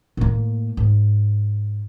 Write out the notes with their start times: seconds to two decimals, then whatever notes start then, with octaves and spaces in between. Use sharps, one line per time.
0.17 A2 A#3
0.77 G#2